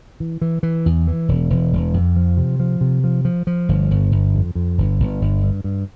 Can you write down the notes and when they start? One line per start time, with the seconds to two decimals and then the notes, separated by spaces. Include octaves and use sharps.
0.20 E3
0.42 E3
0.63 E3
0.86 E2
1.08 E3
1.29 E1
1.50 E1
1.73 E1
1.94 F2
2.16 F3
2.37 C3
2.60 F3
2.81 C3
3.04 F3
3.25 F3
3.47 F3
3.69 G1
3.91 G1
4.12 G1
4.35 F2
4.55 F2
4.78 G1
4.99 G1
5.21 G1
5.43 G2
5.64 G2